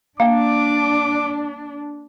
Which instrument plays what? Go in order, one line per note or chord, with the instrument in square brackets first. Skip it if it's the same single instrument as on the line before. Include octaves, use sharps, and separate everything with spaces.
[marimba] A#3 [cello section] D4 [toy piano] F5 G5 [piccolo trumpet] D6